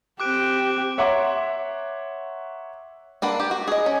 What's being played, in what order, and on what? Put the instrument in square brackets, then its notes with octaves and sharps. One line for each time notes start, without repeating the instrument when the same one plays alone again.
[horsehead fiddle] C4 G4 [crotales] D6 F#6 D7
[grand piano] C#5 E5 F#5 A#5 C6 D6
[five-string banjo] A#3 D4 B4 F#5
G4
F#4
G#4 D#5
C#4